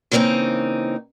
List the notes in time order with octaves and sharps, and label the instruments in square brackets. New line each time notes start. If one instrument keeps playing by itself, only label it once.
[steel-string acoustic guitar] C#3 E3 G3 A#3 C4 D#4